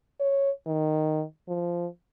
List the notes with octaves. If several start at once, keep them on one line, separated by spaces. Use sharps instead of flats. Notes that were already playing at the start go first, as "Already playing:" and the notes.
C#5
D#3
F3